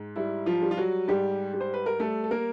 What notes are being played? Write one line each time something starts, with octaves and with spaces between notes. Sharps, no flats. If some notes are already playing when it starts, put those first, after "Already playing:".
Already playing: G#2
G3 E4
F3 F4
G3
F4
F#3 F#4
G#2 G3 G4
G3
C5
B4
A#4
G3 A3 A4
A4
A#3 A#4